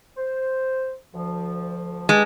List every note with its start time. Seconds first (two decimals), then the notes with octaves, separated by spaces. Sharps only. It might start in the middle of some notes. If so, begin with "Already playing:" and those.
0.17 C5
1.14 D2 F3
2.09 G#3 G4 B4 A5